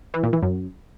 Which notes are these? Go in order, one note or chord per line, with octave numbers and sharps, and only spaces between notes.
E3
A#2
E3
F#2